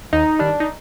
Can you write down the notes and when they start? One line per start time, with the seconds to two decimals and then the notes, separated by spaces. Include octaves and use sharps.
0.13 D#2 D#4
0.39 D#3 G3 D4
0.60 D#4